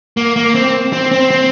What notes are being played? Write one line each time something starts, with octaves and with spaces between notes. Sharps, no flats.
A#3
A#3
C4
C4
C4
C4